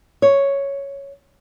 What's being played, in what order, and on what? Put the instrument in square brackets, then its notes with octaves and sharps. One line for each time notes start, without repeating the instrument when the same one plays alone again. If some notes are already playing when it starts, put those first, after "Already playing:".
[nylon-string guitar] C#5